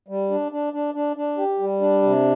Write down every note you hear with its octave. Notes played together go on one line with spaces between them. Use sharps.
G3
D4
D4
D4
D4
D4
G4
G3
D4
C3